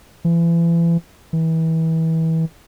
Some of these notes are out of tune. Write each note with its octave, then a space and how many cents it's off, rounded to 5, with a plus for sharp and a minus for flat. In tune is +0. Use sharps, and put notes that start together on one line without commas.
E3 +35
E3 -30